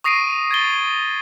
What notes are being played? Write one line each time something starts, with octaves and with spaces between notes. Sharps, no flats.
C#6 D#6 A#6 C7 D7 D#7
G#6 A6 G7